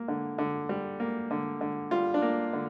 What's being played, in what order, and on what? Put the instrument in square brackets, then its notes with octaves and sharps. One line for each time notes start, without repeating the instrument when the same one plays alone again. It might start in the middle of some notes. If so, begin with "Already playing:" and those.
Already playing: [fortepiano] A#3
D3
D3
G3
A#3
D3
D3
G3 F4
D4
A#3
D3